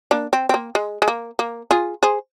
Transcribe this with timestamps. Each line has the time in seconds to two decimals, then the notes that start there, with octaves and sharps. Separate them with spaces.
0.11 A#3 D4
0.33 C4
0.49 C4
0.54 A#3
0.75 G#3
1.02 G#3
1.08 A#3
1.39 A#3
1.71 F4 G#4
2.03 G#4 C5